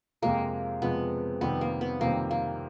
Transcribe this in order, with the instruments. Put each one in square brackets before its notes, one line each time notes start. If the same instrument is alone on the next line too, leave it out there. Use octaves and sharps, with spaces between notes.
[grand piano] F2 C3 F3 G#3 [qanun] A#3
[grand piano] F2 C3 F3 G#3 [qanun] B3
[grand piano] F2 C3 D#3 G3 C4 [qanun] B3
[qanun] A#3
B3
[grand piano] F2 C3 D#3 G3 C4 [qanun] A#3
[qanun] A#3